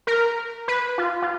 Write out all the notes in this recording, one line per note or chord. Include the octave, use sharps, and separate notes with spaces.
A#4
B4
F4
F4